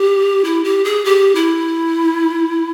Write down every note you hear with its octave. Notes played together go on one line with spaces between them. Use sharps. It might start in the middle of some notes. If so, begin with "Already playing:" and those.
Already playing: G4
E4
G4
G#4
G4
E4